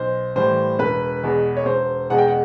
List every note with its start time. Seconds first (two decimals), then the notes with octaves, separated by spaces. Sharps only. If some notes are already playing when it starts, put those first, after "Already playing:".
Already playing: B1 C5
0.36 A2 E3 G3 C5
0.79 E1 B4
1.23 E2 B2 G#3
1.57 C#5
1.66 E1 C5
2.10 E2 B2 G#3 F#5
2.18 G5
2.28 F#5